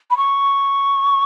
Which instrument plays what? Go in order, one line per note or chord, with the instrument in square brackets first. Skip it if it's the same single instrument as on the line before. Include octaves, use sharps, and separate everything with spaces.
[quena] B5
C#6